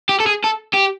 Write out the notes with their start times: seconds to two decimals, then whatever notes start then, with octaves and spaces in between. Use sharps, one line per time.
0.09 G4
0.20 A4
0.27 G#4
0.44 A4
0.74 G4